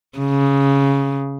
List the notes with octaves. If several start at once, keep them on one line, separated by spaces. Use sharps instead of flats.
C#3